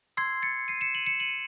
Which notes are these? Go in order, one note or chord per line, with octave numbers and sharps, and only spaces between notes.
C6 E6 G#6 C7
A6 C#7
C7 D#7
C#7 E7
D#7 F#7
C#7 E7
D#7 F#7